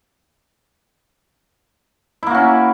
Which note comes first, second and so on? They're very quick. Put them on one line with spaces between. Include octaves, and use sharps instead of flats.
E4 A#3 F#4 C#4